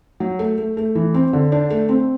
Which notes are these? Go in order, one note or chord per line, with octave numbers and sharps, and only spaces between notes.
F#3
A3
A3
A3
E3
C4
D3
D4
A3
C4